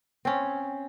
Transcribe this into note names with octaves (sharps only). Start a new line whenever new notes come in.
C4 C#4